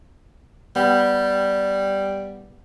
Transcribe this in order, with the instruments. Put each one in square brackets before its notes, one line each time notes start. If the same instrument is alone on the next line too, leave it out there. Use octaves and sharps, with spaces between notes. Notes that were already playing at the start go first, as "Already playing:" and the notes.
[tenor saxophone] G3 [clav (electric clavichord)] B3